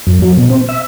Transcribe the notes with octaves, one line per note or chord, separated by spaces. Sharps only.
F#2
F#3
B2
C4
E5